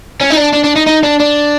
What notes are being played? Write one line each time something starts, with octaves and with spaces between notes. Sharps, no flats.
C#4
D#4
D4
D4
D4
D#4
D#4
D4
D4